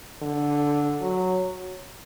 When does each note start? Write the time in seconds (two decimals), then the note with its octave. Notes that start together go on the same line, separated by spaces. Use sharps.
0.22 D3
1.01 F#3